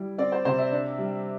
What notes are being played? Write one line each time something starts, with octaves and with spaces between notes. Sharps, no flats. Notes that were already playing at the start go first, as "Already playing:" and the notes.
Already playing: G3 E4
C4 D5
C5
C3 C5
E5
D4
G3